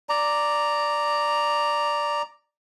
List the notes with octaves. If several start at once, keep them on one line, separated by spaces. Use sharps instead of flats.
D5 A#5